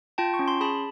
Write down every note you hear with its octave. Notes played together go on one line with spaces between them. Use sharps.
F4 G5 A5
C#6
C#4
C6
G#4 A5 B5